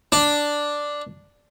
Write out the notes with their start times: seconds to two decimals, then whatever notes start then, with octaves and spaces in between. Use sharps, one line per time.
0.12 D4